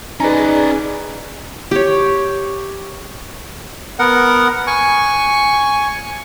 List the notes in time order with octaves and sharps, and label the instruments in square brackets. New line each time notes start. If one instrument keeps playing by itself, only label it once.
[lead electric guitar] C#4 D5 [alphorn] D#4 [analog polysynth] G#4 G#5 [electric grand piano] B4 A#5
[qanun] G4 C#5
[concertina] B3 A#4 F#5
G#5 C#6